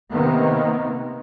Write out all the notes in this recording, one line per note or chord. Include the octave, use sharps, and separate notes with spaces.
C3 D#3 A#3 B3